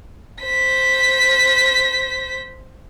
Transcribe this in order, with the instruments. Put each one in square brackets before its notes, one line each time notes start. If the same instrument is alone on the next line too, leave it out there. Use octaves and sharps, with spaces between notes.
[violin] C5 B6